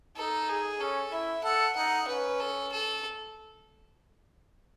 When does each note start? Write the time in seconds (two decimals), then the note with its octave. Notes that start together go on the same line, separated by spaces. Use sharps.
0.17 D#4 A4
0.49 G#4
0.80 C#4 A4
1.12 E4 E5
1.44 A4 F#5
1.76 D#4 F#5
2.08 C#4 B4
2.40 A4
2.72 A4